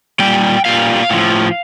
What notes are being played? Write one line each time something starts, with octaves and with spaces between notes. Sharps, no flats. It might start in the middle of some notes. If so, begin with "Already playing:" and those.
A#2 G3 G5
A#2 G3 F5
A2 F3